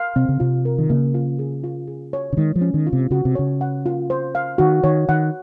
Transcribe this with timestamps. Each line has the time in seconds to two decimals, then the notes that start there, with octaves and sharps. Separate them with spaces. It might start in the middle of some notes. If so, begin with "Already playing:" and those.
Already playing: F5
0.16 C3 C4
0.29 C#3
0.40 C3 F4
0.65 A#4
0.78 D#3
0.89 C#3 A#3
1.14 F4
1.39 G#4
1.64 F4
1.88 G#4
2.13 C#5
2.33 C#3
2.37 D#3 G#3
2.56 F3
2.61 C#4
2.74 D#3
2.86 F4
2.93 C3
3.11 C#3 F#4
3.25 C3
3.35 C#3 C#5
3.61 F#5
3.86 F4
4.10 C5
4.35 F5
4.58 D#3 F#4
4.84 D#3 C#5
5.09 D#3 F#5